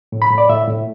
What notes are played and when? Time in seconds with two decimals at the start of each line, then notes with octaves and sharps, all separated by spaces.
0.12 A2
0.22 B5
0.31 A2
0.38 D5
0.49 A2 E5
0.68 A2